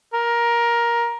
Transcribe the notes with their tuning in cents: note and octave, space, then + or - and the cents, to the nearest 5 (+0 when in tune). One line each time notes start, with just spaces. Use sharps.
A#4 +15